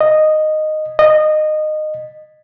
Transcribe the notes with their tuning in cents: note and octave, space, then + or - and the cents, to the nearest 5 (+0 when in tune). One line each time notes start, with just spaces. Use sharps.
D#5 -10
D#5 -20